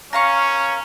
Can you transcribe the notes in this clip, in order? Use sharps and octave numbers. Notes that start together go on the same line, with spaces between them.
C#4 A#4 F5 C#6